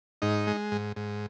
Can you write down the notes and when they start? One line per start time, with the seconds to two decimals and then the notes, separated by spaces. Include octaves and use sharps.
0.22 G#2 D#4
0.47 G#3
0.72 G#2
0.96 G#2